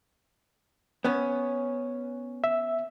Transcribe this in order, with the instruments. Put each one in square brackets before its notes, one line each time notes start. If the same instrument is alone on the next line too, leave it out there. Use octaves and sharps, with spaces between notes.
[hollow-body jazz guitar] B3 C#4
[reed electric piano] E5